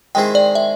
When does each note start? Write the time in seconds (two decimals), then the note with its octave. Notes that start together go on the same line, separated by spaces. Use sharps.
0.15 D#3 G#3 C4 E4 G#4 G5
0.35 D5
0.55 E5